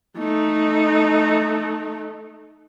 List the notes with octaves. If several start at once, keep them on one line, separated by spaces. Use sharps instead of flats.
A3 D#4